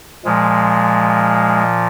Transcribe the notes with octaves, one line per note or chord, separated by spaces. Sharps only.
A#2 F3 G#3